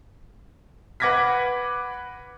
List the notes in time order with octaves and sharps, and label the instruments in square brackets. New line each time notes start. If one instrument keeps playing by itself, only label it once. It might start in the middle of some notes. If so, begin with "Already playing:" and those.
[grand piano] B4 F#5 D6 G#6 A#6 B6